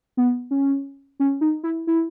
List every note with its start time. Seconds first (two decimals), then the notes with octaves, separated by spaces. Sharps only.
0.17 B3
0.51 C#4
1.20 C#4
1.41 D#4
1.63 E4
1.87 E4